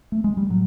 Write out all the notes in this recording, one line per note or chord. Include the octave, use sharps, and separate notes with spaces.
A3
G#3
G3
A2 F#3